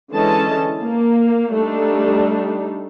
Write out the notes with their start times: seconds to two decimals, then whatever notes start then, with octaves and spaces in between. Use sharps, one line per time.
0.12 D3 E3 G#3 C#4 D#5 A5
0.82 A#3
1.52 G3 A3 D4 D#4